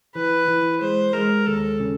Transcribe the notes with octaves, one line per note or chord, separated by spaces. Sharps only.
E3 B4
E3
G#3 C5
G#3 A#4
D#2 A4
C#3